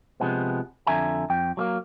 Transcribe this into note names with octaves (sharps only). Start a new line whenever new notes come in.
C3 F3 G#3 B3
F2 D3 E5 G#5 A#5
F2 G5
F#3 A3 A#3